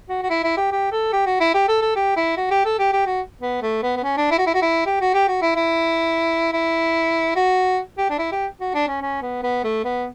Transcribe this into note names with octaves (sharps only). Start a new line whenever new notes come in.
F#4
F#4
E4
E4
G4
G4
A4
G4
F#4
E4
G4
A4
A4
G4
E4
F#4
G4
A4
G4
G4
F#4
B3
A3
B3
B3
C#4
D4
E4
F#4
E4
F#4
E4
G4
F#4
G4
F#4
E4
E4
E4
F#4
G4
D4
E4
G4
F#4
D4
C#4
C#4
B3
B3
A3
B3